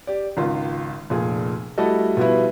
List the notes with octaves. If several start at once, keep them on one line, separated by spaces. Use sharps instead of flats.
G4 D5
G#1 C#2 F4
F1 A#2 G#4
G3 A3 E4 F#4 A4 D#5
B2 F3 G3 B3 E4